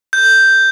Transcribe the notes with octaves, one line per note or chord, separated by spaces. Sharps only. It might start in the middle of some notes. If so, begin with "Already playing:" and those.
G6